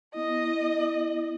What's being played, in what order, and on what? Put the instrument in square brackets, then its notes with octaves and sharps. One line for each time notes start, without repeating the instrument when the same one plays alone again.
[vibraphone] B3 E4 [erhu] D#5